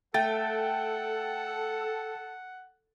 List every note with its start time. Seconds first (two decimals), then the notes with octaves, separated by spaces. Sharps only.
0.14 A3 A4 F#5 G5 A6